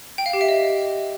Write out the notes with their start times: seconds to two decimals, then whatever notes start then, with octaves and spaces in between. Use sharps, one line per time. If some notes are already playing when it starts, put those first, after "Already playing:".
0.18 G5
0.26 F5
0.33 G4
0.41 E5
0.49 D#5